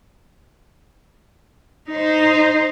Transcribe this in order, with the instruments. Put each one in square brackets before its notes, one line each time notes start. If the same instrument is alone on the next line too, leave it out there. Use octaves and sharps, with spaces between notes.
[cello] D#4 C5